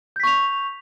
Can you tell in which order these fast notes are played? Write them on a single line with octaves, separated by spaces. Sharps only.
G6 B6 C#6 F7